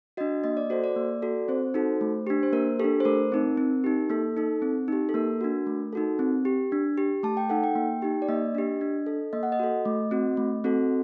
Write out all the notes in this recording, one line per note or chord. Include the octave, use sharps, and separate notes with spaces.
D4 F#4 D#5
A#3 D#5
D5
F#4 A4 C5
D5
A#3
F#4 A4
C4 C5
D#4 F#4 A4
A3
D4 G4
C5
A#3 A#4
D4 G4 A4
C5
A3 A#4
C4 D#4
C4
D#4 G4
A#3 A4
D#4 A4
C4
D#4 G4
A4
A#3 A#4
D4 F#4
A3
D#4 F#4 A4
C4
G4
D4
G4
A3 A5
G5
D#4 A4 F#5
G5
A#3
D#4 G4
D5
A#3 D#5
D4 G4
D4
A4
A#3 D#5
F#5
D#5
F#4 A4
A3
C4 F#4
A3
C4 F#4 A4